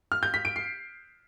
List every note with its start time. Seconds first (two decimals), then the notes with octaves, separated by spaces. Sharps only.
0.12 F6
0.23 G6
0.34 B6
0.45 D7
0.56 C7